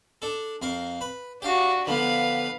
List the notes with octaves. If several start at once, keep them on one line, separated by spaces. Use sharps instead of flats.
D4 A4
F2 A#4 F5
B4
D4 F#4 G4 F5
D3 F3 B3 B4 F5